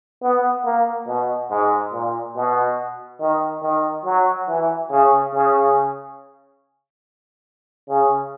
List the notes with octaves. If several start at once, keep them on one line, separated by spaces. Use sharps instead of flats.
B3
A#3
B2
G#2
A#2
B2
D#3
D#3
F#3
E3
C#3
C#3
C#3